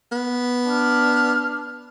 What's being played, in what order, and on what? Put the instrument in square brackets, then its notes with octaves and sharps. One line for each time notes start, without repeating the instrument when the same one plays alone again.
[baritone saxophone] B3
[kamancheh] D4 F6